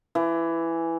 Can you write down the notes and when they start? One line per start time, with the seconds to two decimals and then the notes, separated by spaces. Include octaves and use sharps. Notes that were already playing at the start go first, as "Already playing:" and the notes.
0.15 E3